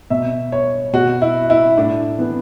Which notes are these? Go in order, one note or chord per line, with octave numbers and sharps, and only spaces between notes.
B2 E5
C#5
B2 F#4
E4
E4
A2 D4
E3 B3